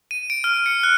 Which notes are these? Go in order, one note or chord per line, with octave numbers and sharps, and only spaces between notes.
D#7
D7
F6
C#7
F#6